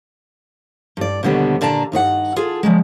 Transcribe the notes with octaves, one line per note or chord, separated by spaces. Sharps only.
G2 D5
D#2 B2 D3 G3 B3 C#5
A#2 D3 D5 A5 A#5
G2 D#4 C5 F#5
F4 G#4 A4
F3 F#3 G#3